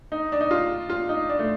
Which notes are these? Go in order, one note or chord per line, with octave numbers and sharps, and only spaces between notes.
D#4
D4
D#4
F4
F4
D#4
D4
A3